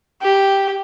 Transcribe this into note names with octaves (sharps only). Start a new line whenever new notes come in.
G4